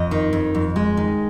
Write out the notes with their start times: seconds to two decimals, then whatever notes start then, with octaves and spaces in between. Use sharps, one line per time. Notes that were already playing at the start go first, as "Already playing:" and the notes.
Already playing: F2 D#5
0.11 D#3
0.33 F2
0.55 F2
0.76 G#3
0.97 D#3